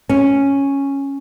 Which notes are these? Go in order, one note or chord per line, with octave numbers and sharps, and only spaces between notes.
C#4